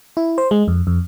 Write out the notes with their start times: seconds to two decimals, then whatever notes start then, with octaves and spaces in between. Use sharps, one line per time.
0.17 E4
0.38 C5
0.51 G#3
0.68 F2
0.87 F2